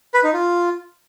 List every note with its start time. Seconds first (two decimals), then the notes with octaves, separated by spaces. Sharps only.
0.14 B4
0.24 D#4
0.33 F4